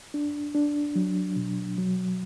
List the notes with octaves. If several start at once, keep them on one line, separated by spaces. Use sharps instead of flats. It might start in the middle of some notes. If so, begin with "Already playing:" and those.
D4
D4
F#3
B2
F#3